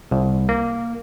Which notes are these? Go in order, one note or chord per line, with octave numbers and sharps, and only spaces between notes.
C2
A#3